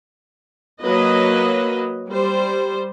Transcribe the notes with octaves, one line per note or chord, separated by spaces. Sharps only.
F#3 A#3 B4 D#5
G3 C5